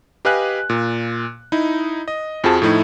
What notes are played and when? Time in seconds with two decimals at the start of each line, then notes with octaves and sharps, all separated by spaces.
0.25 G4 B4 D#5 F5 G#5 F#6
0.70 A#2
1.52 D#4 E4
2.08 D#5
2.44 F2 F3 F#4 G#4 A5
2.62 A2 F3 A3 D#4 E4